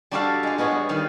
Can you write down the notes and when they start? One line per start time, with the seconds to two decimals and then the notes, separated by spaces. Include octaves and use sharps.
0.11 G3 D4 F#4 G4 A4 F5
0.43 G#3 F4
0.58 G#3 B3 F#4 G#4 C#5
0.71 G3
0.89 D#3 G3 F5